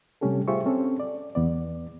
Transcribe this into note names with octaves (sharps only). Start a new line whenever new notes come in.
C3 G3 A3 C#4 G4 A4
F4 G4 G#4 C5 E5 C#6
C4 C#4 A4
D5
E2 B3 D5